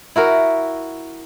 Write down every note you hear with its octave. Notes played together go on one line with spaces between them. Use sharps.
E4 F#4 A#4